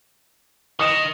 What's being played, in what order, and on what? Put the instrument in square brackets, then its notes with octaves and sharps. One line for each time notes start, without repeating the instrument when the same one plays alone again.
[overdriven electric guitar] D#3 [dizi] D#5 [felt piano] D#6 C#7 E7